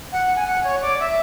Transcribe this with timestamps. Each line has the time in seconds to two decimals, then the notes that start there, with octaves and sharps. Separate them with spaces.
0.12 F#5
0.35 G#5
0.47 F#5
0.63 C#5
0.82 D5
0.99 E5